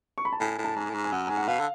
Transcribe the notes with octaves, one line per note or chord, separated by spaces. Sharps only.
C#6
B5
A5
A2 G#5
A2
A5
G#2 G#5
A2
G#2
G#5
F#2 F#5
G#2 G#5
F#5
B2 F5
D3